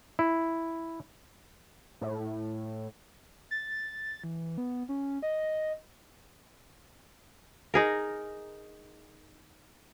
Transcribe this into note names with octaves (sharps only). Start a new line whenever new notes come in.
E4
A2
A6
E3
B3
C#4
D#5
D#4 G#4 A#4